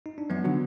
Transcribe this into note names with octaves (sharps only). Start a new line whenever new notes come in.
D#4
D4
F#2 B3
D3 F#3